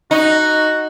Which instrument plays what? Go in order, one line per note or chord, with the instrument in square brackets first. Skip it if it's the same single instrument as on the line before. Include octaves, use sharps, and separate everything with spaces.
[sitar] D#4 [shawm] F#4